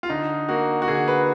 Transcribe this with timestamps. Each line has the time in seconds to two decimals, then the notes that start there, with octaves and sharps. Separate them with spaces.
0.03 F4
0.10 D3 D#4
0.49 A#3 F#4
0.82 F#4
0.88 D3 G#4
1.08 B4